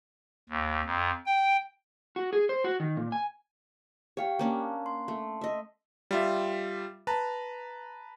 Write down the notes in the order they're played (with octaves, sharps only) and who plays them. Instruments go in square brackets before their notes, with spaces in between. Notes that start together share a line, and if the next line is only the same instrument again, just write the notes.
[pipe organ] D#2
F2
G5
[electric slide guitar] F#4
G#4
C5
F#4
D#3
A#2
G#5
[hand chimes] G4 F5 G5 [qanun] C#5
[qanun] A#3 C#4 D4
[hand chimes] C6
[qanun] A3
D#5 E5
[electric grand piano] G3 F4 E5
B4 A5 A#5